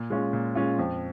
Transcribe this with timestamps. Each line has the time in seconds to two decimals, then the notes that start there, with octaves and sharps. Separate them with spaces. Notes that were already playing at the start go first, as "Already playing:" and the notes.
Already playing: A#2
0.10 G#3 C#4 F4
0.33 A#2
0.55 G#3 C#4 F4
0.78 F2